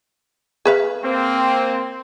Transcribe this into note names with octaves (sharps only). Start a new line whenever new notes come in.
G#4 B4 F5
A#3 C4